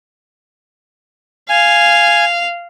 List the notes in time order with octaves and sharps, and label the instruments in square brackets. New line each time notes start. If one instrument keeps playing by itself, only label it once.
[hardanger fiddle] F5 [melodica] G#5